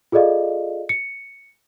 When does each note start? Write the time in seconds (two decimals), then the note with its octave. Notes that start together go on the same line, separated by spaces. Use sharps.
0.12 F4 G#4 A4 D5 D#5 F5
0.89 C#7